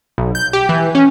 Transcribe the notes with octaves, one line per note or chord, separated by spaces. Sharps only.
B1
G6
G4
E3
C#4